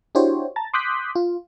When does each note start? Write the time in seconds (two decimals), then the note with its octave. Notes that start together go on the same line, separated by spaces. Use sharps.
0.15 D4 E4 F#4 G4 C5 C#5
0.56 A5 A#5 A6
0.74 C6 D6 D#6 F#6 G6 B6
1.15 F4